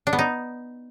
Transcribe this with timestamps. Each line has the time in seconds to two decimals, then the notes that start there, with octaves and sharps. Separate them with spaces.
0.07 D4
0.13 B3
0.19 D#4